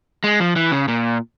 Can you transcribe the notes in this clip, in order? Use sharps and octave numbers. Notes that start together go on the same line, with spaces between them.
G#3
F3
E3
C#3
A#2